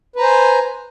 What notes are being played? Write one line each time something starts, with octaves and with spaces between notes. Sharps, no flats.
B4 C5 G#5 A#5